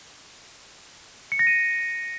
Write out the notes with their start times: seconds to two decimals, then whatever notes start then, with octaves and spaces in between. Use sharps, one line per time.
1.32 C#7
1.39 A#6
1.47 D#7